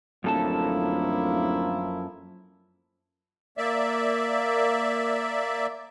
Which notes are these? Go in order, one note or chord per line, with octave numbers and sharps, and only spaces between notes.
D1 F#2 F3 A#3 E4 A4 A5
A#3 D5 E5